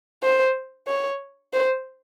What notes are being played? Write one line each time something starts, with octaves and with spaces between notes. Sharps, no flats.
C5
C#5
C5